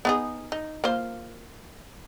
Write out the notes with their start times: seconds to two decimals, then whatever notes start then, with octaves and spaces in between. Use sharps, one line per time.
0.05 B3 D#4 G#4
0.52 D#4
0.84 A#3 F4 C5